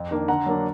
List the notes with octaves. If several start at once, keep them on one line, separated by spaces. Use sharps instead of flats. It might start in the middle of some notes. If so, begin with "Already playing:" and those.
Already playing: F2
D#3 A#3 D4
D3 F#5 A#5
F#3 A#3 D4